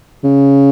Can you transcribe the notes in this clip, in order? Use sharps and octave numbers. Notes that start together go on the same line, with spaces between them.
C#3